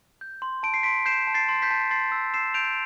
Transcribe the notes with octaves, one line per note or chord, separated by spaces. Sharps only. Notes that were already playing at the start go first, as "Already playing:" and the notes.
G6
C6
A5 D7
C7
C6 B6 D7
G6 C7 E7
A5
A6 C7
C6
G6 B6
A5
C6 A6 C7
E6
E6 C7 E7
G6 D7 F7